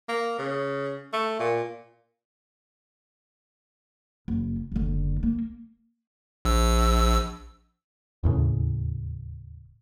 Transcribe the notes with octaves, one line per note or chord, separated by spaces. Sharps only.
A#3
C#3
A3
A#2
F#1
F#1 D3
A#3
A#1 E6
E1 D#2 A2 C#3